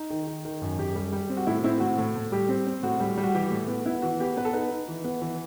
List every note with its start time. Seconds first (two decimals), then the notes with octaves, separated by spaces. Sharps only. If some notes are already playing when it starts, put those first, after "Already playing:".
Already playing: D#4
0.10 D#3
0.27 D#3
0.45 D#3
0.62 F#2
0.78 F#2 G4
0.96 G3
1.13 G3
1.29 C4
1.37 F#4
1.47 A2 E4
1.64 C4 E4
1.80 A2 F#4
1.98 A2
2.15 A2
2.32 G3 G4
2.48 C4
2.67 C4
2.83 A2 F#4
3.00 G3
3.18 G3
3.24 F#4
3.35 E3 G4
3.51 A2
3.68 B3
3.86 B3 E4
4.02 E3 F#4
4.20 B3 G4
4.37 B3 B4
4.45 A4
4.53 D#4 B4
4.71 D#4
4.88 E3
5.04 B3
5.22 E3